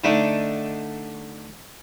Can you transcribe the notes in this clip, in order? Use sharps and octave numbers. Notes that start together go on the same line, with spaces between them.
D3 A3 D4 D#4